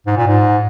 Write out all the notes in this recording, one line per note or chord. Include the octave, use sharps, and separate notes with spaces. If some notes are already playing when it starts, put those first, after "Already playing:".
G#2
A#2
G#2